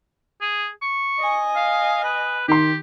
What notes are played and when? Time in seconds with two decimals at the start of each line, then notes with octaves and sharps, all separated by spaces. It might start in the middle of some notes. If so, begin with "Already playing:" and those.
0.41 G#4
0.82 C#6
1.19 D#5 G#5
1.56 F5
2.04 B4
2.48 D#3 G4 C6